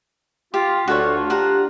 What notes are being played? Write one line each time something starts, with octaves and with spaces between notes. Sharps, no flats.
F4 G4
D2 D4 F4 F#4 A4 C#5
F#4 G4 F#5 A#5